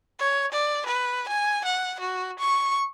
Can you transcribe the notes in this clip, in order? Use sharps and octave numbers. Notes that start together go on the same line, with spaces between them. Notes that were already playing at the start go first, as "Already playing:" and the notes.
C#5
D5
B4
G#5
F#5
F#4
C#6